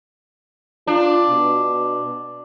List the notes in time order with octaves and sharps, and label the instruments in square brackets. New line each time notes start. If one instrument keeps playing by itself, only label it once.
[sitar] D4 [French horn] F4
[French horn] B2